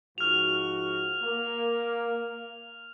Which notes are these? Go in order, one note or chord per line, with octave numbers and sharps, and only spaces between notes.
G#2 F3 F#4 F6 F7
A#3